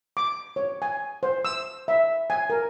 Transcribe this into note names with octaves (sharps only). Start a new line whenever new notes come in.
D6
C#5
G#5
C5
E6
E5
G#5
A#4